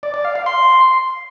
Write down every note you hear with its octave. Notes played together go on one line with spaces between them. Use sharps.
D5
D5
F5
F5
C6